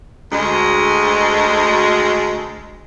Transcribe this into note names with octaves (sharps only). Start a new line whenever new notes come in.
D2 G#3